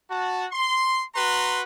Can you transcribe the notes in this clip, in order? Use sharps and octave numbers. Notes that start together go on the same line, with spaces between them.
F#4 A5
C6
F#4 B4 A#5 C6